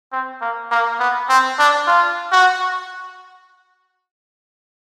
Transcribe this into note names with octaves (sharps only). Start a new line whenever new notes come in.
C4
A#3
A#3
B3
C4
D4
F4
F#4